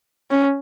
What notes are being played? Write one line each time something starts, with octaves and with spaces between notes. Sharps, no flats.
C#4